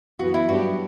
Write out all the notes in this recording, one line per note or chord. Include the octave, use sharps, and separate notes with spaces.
F#2 E3 B3 F#4
E4
G2 F#3 B3 D4 F#4 G4